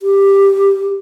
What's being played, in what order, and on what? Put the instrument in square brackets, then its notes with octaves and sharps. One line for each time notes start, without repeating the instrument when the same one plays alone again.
[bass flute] G4